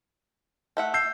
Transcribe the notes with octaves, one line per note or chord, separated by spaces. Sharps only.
A3 E5 F#5
E6 G6 C7